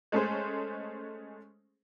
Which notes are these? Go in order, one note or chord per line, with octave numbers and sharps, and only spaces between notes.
G#3 A3 C#4 G#4 C5